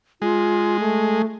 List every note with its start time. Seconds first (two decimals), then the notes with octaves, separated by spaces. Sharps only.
0.22 G#3 F4
0.80 A3